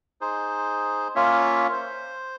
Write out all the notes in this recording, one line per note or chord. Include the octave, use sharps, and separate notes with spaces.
D#4 G#4 C5
A#3 C#4 F4 C#5 E5
C5